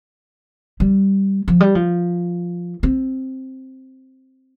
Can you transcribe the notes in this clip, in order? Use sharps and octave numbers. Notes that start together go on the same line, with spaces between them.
G3
F3
G3
F3
C4